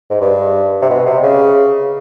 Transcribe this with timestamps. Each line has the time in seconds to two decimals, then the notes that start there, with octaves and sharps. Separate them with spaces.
0.10 G#2
0.21 G2
0.82 C3
0.90 B2
1.06 C3
1.23 C#3